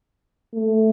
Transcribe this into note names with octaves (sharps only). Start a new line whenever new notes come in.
A3